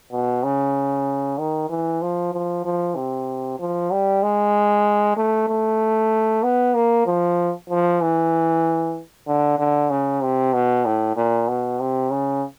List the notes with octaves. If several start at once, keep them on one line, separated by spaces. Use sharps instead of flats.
B2
C#3
D#3
E3
F3
F3
F3
C3
F3
G3
G#3
A3
A3
B3
A#3
F3
F3
E3
D3
D3
C#3
C3
B2
A2
A#2
B2
C3
C#3